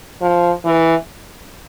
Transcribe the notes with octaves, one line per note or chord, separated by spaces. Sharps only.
F3
E3